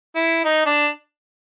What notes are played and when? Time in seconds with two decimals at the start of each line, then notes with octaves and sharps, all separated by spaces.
0.15 E4
0.45 D#4
0.66 D4